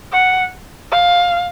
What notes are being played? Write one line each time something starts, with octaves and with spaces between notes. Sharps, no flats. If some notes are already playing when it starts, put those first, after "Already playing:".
F#5
F5